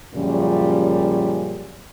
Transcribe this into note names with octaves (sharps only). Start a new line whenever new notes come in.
F#2 A#2 C#3 F3 G3 C#4